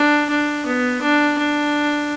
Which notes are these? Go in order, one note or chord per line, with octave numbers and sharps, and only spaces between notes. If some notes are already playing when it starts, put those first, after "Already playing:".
Already playing: D4
D4
B3
D4
D4